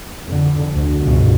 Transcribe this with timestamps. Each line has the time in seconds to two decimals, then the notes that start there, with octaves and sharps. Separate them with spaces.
0.25 F2 D3
0.72 D2
1.03 C#2 G2 B2